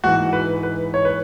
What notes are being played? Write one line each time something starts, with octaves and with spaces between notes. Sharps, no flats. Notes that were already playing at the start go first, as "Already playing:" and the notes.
G#2 E3 F#4
B4
B4
C#5
B4